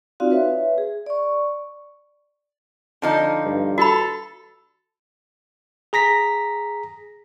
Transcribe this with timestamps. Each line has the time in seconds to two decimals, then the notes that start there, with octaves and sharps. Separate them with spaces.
0.20 C4 D#4 F4 F#4 D5 F5
0.31 B4 C#5 E5
0.78 G#4
1.06 D5 C#6
3.02 D3 F3 D#4
3.45 G2
3.78 F#4 A4 B5
5.93 G#4 A#5 A#6 B6